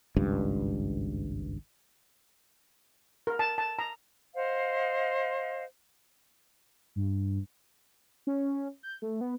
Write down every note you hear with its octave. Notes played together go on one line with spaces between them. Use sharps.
G#1 C#2 G2
A#4
A5
A5
A#5
C5 D#5 F5 F#5
G2
C#4
G6
A3
B3